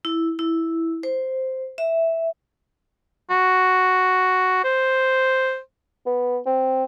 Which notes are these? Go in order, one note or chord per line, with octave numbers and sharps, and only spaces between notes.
E4
E4
C5
E5
F#4
C5
B3
C4